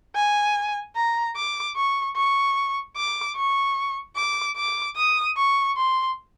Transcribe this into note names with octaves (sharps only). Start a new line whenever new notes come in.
G#5
A#5
D6
C#6
C#6
D6
C#6
D6
D6
D#6
C#6
C6